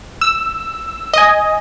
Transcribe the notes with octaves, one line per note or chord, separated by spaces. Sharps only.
E6
D#5 G#5